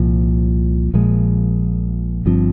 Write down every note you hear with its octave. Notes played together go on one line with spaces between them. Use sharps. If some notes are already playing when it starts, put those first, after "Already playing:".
Already playing: C2 A#2 F3
A#1 A#2 F3 G#3
G1 G2 F3 C4